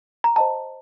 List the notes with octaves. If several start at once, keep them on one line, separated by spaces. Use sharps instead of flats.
A#5
C5 D#5 G5 A5